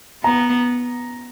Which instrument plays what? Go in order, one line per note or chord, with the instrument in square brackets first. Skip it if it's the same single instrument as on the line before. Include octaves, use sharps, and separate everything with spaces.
[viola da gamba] B3 [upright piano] A#5